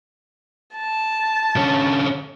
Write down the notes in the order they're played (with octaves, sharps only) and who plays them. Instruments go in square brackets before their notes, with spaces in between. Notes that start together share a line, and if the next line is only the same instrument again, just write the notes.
[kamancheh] A5
[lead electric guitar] D3 C#4